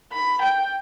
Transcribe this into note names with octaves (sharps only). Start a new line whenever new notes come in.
B5
G5